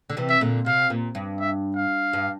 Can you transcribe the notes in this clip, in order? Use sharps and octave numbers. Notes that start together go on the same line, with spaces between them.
D3
C3 E3
E5
A#2 D3
C3 F5
A#2
G2
E5
F5
G2